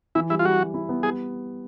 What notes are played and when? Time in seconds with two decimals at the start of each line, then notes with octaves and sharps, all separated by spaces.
0.15 E3 E4
0.30 G3 E4
0.39 F4
0.45 G3 F#4
0.59 G3
0.74 E4
0.89 B3
1.03 G3 G#4